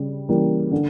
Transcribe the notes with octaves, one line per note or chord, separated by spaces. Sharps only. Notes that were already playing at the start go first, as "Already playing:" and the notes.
Already playing: C#3 G3
E3 G3 A#3 C#4
D3